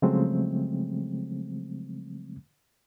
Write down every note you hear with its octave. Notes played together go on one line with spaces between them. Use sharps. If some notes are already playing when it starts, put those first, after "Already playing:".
C#3 F3 F#3 G#3 A3 C4